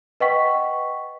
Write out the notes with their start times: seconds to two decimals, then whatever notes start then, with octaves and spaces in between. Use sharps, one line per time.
0.20 B4 D#5 F#5 G5 C#6 B6